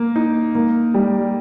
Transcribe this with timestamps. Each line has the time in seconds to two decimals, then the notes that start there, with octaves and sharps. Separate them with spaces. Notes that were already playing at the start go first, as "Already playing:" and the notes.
Already playing: A#3
0.16 D#4
0.55 A#3
0.94 G3